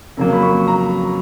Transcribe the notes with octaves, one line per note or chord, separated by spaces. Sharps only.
F2 C#3 F#3 A#3
B5
C#6
A#5